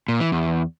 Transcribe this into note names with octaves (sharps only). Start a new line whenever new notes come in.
A#2
E3
E2